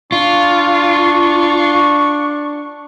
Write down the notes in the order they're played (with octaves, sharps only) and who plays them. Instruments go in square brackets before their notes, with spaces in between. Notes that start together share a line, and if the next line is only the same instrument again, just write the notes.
[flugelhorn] D4 [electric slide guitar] F4 [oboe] C#6